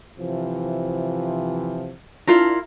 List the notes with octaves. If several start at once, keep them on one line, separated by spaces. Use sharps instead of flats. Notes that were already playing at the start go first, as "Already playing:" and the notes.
C3 E3 F3
D4 E4 F4 A#4